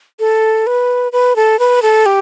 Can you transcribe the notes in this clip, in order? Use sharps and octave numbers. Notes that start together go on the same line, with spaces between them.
A4
B4
B4
A4
B4
A4
G4